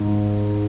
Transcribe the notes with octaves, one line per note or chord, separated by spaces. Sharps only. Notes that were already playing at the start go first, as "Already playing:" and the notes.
Already playing: G#2